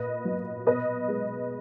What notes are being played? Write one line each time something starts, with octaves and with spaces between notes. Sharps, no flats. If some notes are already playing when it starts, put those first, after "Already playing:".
Already playing: A#2 B4 D#5
F#3
B2 B4 D#5
G#3